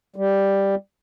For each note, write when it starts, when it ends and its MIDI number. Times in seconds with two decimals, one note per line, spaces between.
0.16 0.75 55